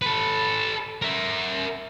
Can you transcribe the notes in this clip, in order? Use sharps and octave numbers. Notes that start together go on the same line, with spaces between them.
A4 B4
A#4 E5